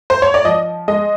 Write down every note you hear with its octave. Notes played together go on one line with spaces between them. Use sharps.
C5
C#5
D5
F3 D#5
G#3 D#5